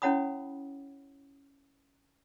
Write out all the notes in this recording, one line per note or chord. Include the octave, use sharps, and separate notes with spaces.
C#4 E4 C#5 F#5 B5 D#6